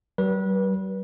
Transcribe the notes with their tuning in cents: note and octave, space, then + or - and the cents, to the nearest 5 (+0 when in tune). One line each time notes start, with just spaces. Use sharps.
G3 -45 B4 -30